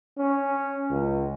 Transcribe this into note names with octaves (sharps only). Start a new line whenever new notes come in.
C#4
C#2